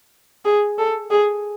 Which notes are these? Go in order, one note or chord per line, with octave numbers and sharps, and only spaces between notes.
G#4
A4
G#4